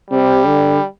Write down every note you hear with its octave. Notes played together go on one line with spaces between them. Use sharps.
C3 G3
D3